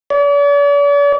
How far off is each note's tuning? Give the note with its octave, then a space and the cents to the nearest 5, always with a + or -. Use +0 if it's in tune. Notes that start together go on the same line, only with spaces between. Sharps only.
D5 -45